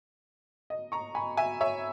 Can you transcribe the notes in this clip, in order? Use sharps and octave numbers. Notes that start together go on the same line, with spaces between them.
D#5
A#5 C#6
G#5 B5
E5 G#5
C#5 E5